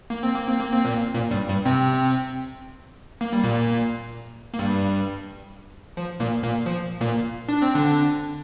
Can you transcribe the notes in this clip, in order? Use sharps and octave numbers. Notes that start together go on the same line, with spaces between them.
A#3
C4
A#3
C4
A#3
C4
A#2 A#3
A#2 A#3
G2 G3
G2 G3
C3 C4
A#3
G3
A#2 A#3
A#3
G2 G3
F3
A#2 A#3
A#2 A#3
F3
A#2 A#3
D4
C4
D3 D4